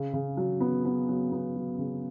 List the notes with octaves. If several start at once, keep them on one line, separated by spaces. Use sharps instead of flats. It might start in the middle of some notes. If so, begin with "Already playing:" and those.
Already playing: C#3
C#3
F#3
B3
B3
F#3
B3
F#3
C#3